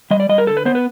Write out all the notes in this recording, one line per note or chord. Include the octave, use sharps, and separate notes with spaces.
G3 D#5
D5
G3 D#5
A#4
D3 A4
B4
B3 C5
B4